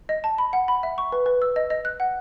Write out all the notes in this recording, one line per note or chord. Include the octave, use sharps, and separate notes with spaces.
D#5
A5
B5
F#5
B5
E5
C#6
B4
B4
E6
D#5
D#5
F#6
F#5